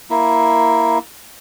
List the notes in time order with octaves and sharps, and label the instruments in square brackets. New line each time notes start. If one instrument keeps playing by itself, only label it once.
[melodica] A#3 E4